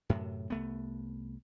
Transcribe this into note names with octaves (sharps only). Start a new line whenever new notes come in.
F#2 A2 C3
C2 A3 B3